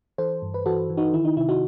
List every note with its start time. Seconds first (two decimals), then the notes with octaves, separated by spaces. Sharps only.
0.18 E3 A4 C5
0.42 G2
0.54 B4
0.66 E3 F#4 A4
0.90 E3
0.97 D#4 F#4
1.13 D#3 E4
1.25 D#4
1.37 C3 E4
1.49 D#4 F#4